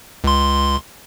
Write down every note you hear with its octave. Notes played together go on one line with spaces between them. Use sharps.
C#2 C6